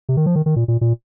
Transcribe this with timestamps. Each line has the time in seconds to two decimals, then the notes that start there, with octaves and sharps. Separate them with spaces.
0.09 C3
0.17 D#3
0.26 F3
0.36 D#3
0.46 D#3
0.56 A#2
0.68 A#2
0.81 A#2